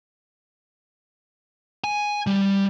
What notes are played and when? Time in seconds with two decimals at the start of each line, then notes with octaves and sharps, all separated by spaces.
1.84 G#5
2.27 G3